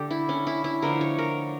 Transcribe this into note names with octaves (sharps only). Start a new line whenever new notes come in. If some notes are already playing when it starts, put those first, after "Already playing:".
Already playing: D3 A3 G4 A4
E4
C#4
E4
E4
D3 F3 A3 A#4
C#5
A#4